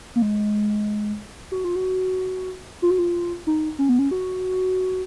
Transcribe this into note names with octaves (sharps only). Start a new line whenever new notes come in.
A#3
G#3
F#4
F4
F#4
F4
F#4
F4
D#4
C#4
B3
C#4
F#4